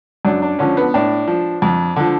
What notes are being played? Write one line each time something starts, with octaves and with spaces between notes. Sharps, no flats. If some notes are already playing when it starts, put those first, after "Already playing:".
F#2 D4
D4
D3 F3 C#4
B3
A2 D4
F3
F2
D3 F3